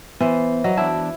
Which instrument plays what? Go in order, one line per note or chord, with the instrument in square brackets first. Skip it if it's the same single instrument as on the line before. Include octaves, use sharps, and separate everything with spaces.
[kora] E3 C5 [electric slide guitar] B3
[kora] F#3 [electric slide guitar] D#5
[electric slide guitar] E2 D4 A5 [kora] E4